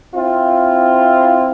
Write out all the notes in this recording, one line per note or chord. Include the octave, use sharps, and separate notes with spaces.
C4 E4 F4